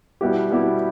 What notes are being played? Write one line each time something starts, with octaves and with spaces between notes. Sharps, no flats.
B2 G3 B3 E4 G4
B2 G3 B3 E4 G4